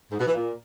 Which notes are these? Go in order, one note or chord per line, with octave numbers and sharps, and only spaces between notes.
G#2
B2
E3
A#2